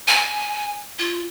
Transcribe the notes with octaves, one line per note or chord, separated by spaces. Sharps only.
G#5
F4